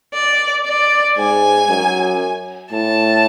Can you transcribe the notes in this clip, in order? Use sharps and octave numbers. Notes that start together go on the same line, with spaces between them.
D5
D5
G#2 G#5
F#2
A2 A5